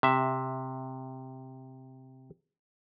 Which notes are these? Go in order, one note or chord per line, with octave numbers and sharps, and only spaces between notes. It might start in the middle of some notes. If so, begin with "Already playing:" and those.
C3 E5